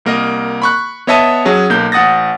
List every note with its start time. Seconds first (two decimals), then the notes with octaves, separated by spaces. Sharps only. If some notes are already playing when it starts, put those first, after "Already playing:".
0.05 C2 A#3 A#4 D#5
0.62 B5 C#6 F#6
1.07 B3 C#5 D#5 E5 A5 D#7
1.45 F#3 C#4 G#4
1.70 B1 A#3 G6
1.92 A1 F#5 D#6 A6 A#6